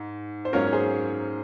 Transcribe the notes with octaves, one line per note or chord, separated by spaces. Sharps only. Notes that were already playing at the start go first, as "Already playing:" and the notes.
Already playing: G#2
C5
G#2 F#3 C#4 F4 A#4 C#5
C#5
G#4 C5